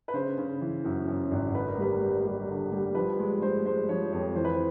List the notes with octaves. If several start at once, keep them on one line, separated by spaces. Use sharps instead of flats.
B4
C#3 C5
C#3
E3
F#2
F#2
G#1
D3 B4
A#4
G3 B4
G3
G3
D3
G3
F3 B4
G#3
G#3 C5
G#3 C5
F3 C#5
F2 C#5
E3 C5
B4
C5